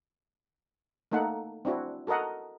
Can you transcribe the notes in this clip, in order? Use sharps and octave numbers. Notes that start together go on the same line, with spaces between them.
A3 A#3 D#4 A4 F#5
C4 D4 E4 F#4
F#4 A4 A#4 D#5 F#5